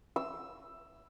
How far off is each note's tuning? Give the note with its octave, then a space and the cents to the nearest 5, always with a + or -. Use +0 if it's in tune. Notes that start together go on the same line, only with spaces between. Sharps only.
E6 +10